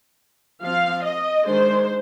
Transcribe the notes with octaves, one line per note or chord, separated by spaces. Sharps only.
F3 C4 F5
D#5
D#3 G#3 D4 C5